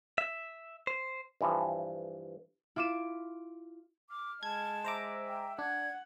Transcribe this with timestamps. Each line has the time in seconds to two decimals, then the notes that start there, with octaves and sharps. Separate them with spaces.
0.18 E5
0.87 C5
1.41 G2 E3 F3
2.76 E4 F4 D6 D#7 E7
4.10 D6 F6
4.43 G#3 A5 G#6
4.84 C5 E5 A#5 D6
5.28 G5
5.59 D4 F#5 G#6